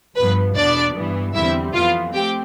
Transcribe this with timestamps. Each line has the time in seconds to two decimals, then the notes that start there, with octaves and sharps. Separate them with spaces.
0.16 G2 F3 B3 B4
0.56 E2 B2 B3 D4 D5
0.95 G2 E3 B3
1.35 E2 D3 G3 C4 E4 E5
1.74 F2 E3 B3 F4 F5
2.14 A3 C4 G4 G5